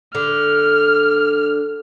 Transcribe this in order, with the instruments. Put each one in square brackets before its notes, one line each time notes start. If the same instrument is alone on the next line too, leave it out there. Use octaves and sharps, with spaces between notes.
[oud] D3 [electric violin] F6